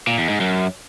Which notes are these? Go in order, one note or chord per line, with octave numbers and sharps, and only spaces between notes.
A#2
E2
G#2
F#2